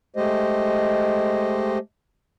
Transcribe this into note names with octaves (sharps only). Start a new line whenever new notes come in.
G#3 A3 G4 C5 D#5